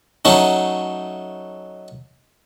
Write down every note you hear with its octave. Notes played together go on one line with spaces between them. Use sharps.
F#3 A3 C#4 D#4